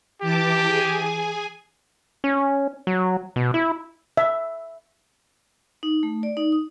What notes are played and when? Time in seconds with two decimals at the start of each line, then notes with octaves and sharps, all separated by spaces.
0.22 E3 G4 A5 D6
0.66 G#4 G#5
2.24 C#4
2.87 F#3
3.36 B2
3.54 E4
4.17 E5
5.83 D#4
6.03 A3
6.23 D5
6.37 D#4
6.52 D#6